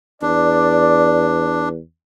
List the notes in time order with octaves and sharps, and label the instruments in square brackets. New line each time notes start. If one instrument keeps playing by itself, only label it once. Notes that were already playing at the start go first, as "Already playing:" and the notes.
[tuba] E2 [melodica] D4 [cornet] D5